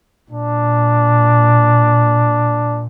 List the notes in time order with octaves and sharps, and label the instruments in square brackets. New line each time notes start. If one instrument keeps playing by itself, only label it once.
[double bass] A#2 [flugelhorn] D4